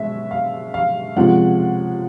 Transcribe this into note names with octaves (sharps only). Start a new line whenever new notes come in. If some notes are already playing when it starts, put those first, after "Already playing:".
Already playing: B2 G#3 C#4 E5
F5
F5
C3 F3 G#3 C#4 F#5